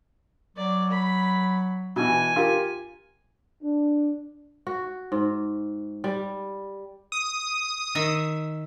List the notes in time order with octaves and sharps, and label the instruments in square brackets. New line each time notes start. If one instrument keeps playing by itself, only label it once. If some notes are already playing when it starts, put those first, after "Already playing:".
[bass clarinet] F#3 [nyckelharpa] D5
[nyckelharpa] B5
[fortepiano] B2 E3 [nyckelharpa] G#5
[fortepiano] F4 G4 A#4
[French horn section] D4
[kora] F#4
G#2
G3
[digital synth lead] D#6
[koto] D#3 E5